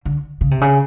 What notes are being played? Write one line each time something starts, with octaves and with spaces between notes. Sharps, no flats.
D3
C#3
C3
C#3